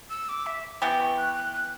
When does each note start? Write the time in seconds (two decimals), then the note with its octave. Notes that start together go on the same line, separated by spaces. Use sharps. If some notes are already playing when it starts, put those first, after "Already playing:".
0.10 E6
0.29 D6
0.46 E5
0.82 E3 B3 E4 G4 G5
1.00 C#6
1.18 F#6
1.35 F#6
1.53 F#6